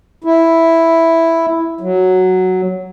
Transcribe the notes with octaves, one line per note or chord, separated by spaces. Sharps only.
E4
F#3